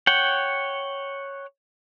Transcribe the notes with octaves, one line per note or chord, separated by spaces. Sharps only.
C#5 F#5 G5